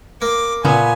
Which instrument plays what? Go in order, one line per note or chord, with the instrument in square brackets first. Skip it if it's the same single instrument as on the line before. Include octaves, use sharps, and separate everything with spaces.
[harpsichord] A#3 [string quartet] D6
[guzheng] A#2 B3 [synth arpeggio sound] C#3 [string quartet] G#5